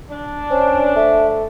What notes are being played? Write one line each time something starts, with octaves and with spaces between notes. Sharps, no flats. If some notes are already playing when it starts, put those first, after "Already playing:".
D4
C#4 C5
A3 E5